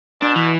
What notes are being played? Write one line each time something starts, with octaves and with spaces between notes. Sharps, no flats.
B2 D4
E3